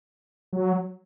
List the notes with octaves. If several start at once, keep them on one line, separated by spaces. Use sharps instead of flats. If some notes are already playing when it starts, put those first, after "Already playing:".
F#3